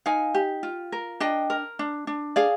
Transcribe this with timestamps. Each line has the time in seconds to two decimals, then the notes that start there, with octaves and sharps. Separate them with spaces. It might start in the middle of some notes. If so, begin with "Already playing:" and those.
0.06 D#4 F5 G#5
0.34 G4
0.63 F4
0.92 A#4
1.20 D4 D#5 G5
1.50 A#4
1.79 D4
2.07 D4
2.36 G#4 D5 F5